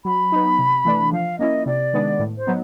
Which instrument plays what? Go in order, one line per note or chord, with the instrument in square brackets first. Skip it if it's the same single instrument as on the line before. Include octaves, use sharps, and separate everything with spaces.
[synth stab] F#3 [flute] B5
[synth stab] B3 D#4
C3
E3 A3 D4
[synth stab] F3 [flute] F5
[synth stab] A#3 C#4 E4 [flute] D#5
[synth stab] C3 [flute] D5
[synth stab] D#3 G#3 B3 D4
A2
[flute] C5
[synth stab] F#3 B3 D#4